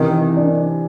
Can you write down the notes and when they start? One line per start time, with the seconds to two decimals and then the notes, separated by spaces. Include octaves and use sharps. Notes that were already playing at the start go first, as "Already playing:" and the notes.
Already playing: C3 D#3 E3
0.36 D4